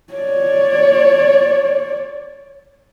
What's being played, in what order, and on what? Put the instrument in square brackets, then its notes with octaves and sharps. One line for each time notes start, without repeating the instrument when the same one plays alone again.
[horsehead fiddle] C#5 D5